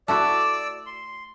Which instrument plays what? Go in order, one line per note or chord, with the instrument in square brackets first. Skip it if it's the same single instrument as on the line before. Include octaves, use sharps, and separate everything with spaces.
[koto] A3 E4 F#4 [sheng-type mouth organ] D5 D6 E6
[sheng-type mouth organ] C6